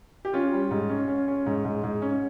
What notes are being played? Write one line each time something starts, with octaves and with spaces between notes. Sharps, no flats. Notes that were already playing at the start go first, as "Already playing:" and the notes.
G4
C#4 F4
G3
G#2
C#4
C#4
C#4
G#2
G#2
G#2
C#4